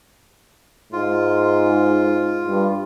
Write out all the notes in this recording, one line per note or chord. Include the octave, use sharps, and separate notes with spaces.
G#2 F4
G2